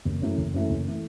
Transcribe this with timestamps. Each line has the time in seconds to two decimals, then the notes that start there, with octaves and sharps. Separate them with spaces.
0.05 F#1
0.22 F#2 E3 A3
0.38 F#1
0.54 F#2 E3 A3
0.70 F#1
0.88 E3 A3